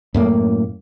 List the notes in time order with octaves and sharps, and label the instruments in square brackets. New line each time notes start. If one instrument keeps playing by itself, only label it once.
[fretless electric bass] F#2 A2 A#3